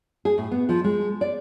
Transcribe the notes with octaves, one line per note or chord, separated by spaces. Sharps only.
G#4
A2
B3
F3
G#3
D5